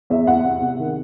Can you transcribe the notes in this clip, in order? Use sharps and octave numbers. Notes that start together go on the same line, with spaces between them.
E2 E5
E2 F#5
C3
C3
D#3